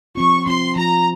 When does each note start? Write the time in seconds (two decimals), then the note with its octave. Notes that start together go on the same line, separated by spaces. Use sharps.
0.15 F3 C4 F4 C#6
0.46 F3 C4 F4 C6
0.75 F3 C4 F4 A#5